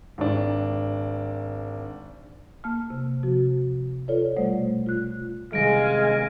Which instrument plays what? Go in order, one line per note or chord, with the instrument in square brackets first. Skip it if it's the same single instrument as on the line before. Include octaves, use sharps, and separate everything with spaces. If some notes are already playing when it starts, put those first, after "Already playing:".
[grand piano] G#1 D4
[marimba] A#3 A5 F6
C3
C3 F3 F#4
F4 A4 B4 C#5 D5
B2 G3 A3 C5 D5 F#5
F4 F#6
[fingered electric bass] C3 D#3 G3 [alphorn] G#3 [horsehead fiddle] F5 G#5 [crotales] A#6 D7